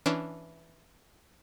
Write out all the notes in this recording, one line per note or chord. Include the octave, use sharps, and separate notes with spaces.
E3 C#4 D4